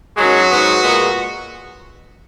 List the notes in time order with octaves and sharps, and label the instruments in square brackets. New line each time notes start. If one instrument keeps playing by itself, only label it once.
[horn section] F#2 D#3 F#3 G#3 F#4
G#2 F#3 B3
A#2 G#3 B3